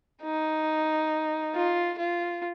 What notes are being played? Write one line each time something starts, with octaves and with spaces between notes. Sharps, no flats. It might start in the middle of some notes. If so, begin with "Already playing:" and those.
D#4
F4
F4